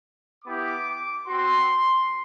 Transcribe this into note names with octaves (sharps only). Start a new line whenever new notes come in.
B3 E4 G4 D6
C4 F#4 C6